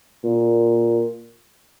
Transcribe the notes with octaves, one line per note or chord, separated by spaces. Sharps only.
A#2